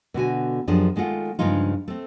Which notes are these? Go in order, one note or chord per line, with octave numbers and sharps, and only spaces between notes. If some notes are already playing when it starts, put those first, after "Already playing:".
B2 D3 F#4 G#5
F#2 F3 D4 G4 G#4
D#3 G#3 A3 F4 F#5
G2 C#3 F3 G#3 D#4 F4
A3 C4